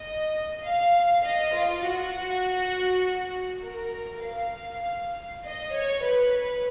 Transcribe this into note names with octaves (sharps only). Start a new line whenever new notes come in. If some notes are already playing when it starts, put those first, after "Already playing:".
Already playing: D#5
F5
D#5
F4
F#4
A#4
F5
D#5
C#5
B4